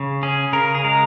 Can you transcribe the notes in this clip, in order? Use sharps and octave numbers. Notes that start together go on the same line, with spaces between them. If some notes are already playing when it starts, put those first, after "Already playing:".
Already playing: C#3
C#4 G#4
C#3 A#4
G#4
G#3 A#4